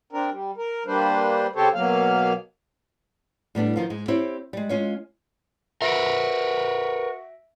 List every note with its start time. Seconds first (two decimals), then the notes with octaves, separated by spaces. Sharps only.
0.13 C4 D4 A#4
0.30 G3
0.57 A#4
0.86 G3 A#3 D4 B4 C5
1.56 C#3 C4 G4 A4 C5 C#5
1.74 B2 F#3 A#3 F5
3.55 A2 G3 B3 D4
3.76 D#3 F3 F4
3.90 G#2 G#3
4.08 C4 E4 G4 C5 C#5
4.53 G3 G#3
4.69 G#3 C#4 F4 C#5
5.82 F#4 A#4 B4 E5 A#6 D7